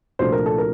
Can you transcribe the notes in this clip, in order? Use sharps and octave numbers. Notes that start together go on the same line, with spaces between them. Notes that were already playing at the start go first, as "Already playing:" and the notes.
C2 A#2 F3 A3 D4 C5
A#4
A4
A#4